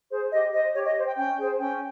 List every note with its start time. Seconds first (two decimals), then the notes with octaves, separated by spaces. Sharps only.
0.10 G#4 C5
0.31 G4 D#5
0.53 C5 D#5
0.74 G4 C#5
0.85 D#5
0.96 C5
1.06 G5
1.17 C#4 G5
1.39 G#4 C5
1.59 C#4 G5